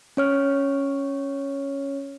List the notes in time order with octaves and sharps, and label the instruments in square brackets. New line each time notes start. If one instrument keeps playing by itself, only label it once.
[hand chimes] C#4 C#5 F6